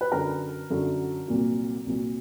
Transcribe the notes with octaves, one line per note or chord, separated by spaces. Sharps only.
B4
F#2 D3 F#3 A#4
F#2 D3 F#3
C2 A#2 F#3
C2 A#2 F#3